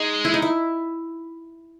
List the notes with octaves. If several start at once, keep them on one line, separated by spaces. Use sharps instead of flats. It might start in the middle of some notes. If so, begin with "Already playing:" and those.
Already playing: G#3 D#4
E4
D#4
E4